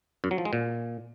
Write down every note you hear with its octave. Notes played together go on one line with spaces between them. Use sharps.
F#2
F#3
F3
G#3
A#2